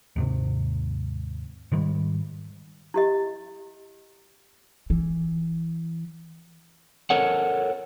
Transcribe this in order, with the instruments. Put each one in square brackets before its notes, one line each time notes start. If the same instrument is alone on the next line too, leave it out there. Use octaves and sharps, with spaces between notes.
[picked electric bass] D#2 G#2 C3
G#2 D#3 G3
[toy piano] E4 G4 D#5
[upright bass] E3
[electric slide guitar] A4 A#4 C#5 F#5